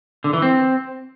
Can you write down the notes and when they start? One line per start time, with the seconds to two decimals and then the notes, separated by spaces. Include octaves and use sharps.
0.24 D3
0.33 E3
0.42 C4